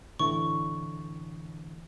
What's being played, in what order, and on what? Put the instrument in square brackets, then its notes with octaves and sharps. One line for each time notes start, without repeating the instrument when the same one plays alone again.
[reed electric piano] A2 D3 E3 [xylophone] C#6